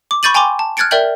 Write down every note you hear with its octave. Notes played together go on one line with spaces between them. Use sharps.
D6
B5 C#6 G6 A6 D#7 F#7
G5 G#5 A#5 C6 D6
A5
F6 F#6 G#6 A6 C#7 D7
A#4 D5 E5 G5 G6 F#7